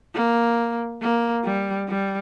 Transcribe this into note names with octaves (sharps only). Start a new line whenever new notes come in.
A#3
A#3
G3
G3